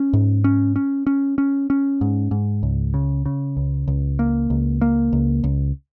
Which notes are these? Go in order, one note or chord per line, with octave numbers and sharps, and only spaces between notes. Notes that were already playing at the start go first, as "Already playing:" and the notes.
Already playing: C#4
G#2
C#4
C#4
C#4
C#4
C#4
G#2
G#2
C#2
C#3
C#3
C#2
C#2
A#3
C#2
A#3
C#2
C#2